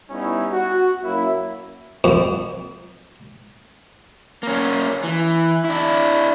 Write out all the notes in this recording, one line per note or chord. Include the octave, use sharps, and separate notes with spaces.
G3 B3 C#4 D#4 E4
F#4
F#2 A#3 E4
F2
A#3 C#4
E3
D4 E4